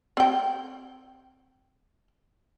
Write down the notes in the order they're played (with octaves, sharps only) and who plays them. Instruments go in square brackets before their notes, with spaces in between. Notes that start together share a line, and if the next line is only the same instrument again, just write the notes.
[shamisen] C4 G5